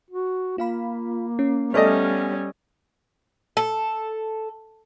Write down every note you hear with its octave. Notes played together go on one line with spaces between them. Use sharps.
F#4
A#3 F4 F5 B5
C#4
G3 A3 B3 C#4 D5 D#5 G#5 F6
A4